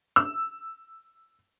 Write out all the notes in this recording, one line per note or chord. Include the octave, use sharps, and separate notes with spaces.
E6